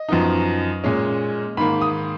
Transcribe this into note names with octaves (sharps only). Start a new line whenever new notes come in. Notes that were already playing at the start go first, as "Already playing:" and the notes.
Already playing: D#5
F#2 F3 B3 D#4
A#2 G#3 C#4
G#2 D#3 A#3 B5
D#6